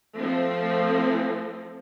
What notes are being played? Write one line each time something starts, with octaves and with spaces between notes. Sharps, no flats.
F3 A3 C4